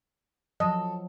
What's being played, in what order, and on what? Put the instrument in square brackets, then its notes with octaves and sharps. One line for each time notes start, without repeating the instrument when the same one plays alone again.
[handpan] F3 F#3 [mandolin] A4 [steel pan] D#5